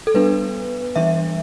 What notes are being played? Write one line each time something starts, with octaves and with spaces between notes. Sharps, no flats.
A4
G3 B3 D4 B4
E3 G3 D4 E5